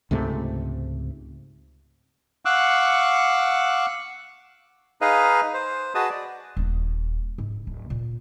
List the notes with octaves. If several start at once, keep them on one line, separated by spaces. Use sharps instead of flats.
C#2 G#2 C3 A3
F5 F#5 C#6 D6 E6 F#6
D#4 G#4 B4 D#5 F5
C5
F#4 G#4 B4 D#5 A5 D#6
D5
D#1 D#4
G#2
D1
A#2